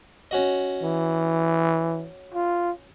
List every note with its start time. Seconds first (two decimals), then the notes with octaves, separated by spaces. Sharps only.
0.31 C#4 F#4 D#5
0.83 E3
2.34 F4